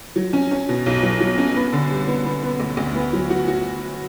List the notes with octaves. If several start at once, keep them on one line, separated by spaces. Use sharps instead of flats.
F#3
C#4
C#4
B2
B1
F#3
F#3
C#4
B3
D3
G3
B3
B3
B3
D2
D2
B3
F#3
F#4
F#4